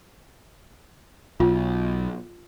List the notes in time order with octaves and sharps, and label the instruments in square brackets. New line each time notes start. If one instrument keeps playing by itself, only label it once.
[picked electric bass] B1 [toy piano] F4